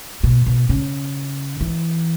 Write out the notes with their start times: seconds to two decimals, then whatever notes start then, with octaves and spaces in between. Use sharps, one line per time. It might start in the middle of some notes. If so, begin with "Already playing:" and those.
0.24 B2
0.46 B2
0.69 C#3
1.61 E3